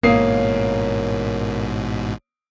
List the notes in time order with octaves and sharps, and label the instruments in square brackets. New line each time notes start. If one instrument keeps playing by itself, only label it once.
[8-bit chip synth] A1 G#2 B2 [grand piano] A#3 D#6 C7 [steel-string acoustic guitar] C#5 F5